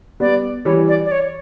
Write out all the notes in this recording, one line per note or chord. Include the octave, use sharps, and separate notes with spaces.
G3 B3 D5
E3 G3 C#5
D5
D5
C#5